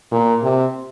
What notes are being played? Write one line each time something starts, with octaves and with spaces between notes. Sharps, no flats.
A#2
C3